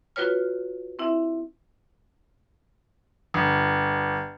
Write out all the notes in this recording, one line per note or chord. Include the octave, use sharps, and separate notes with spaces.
F4 F#4 B4 C#5 F6
C4 E4 E5
G1